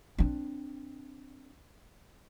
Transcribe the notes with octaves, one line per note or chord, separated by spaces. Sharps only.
C4 D4